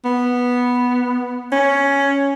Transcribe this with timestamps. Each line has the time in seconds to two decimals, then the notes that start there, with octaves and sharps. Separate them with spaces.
0.05 B3
1.52 C#4